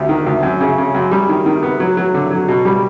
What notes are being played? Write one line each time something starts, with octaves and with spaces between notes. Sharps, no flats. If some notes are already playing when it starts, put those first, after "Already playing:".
Already playing: D2 C3
D#3
D2
F#2
C#3
C#3
F#2
G3
D#3
D#3
B3
F#3
F#3
D3
F#3
B2
G3